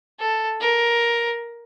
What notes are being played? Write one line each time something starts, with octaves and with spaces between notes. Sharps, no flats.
A4
A#4